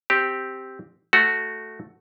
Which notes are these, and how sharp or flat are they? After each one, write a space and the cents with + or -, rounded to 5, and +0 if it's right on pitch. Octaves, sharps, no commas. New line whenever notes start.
C4 +0 G4 +0
A3 +0 F#4 +0